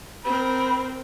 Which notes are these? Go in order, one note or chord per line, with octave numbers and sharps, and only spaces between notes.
C4 A#4 B5